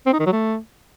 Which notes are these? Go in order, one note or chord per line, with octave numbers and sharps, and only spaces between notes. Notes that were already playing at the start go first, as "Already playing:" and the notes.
C4
D#4
D#3
F#3
A3